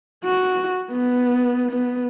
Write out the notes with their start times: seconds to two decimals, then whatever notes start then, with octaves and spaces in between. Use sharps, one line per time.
0.24 F#4
0.91 B3
1.71 B3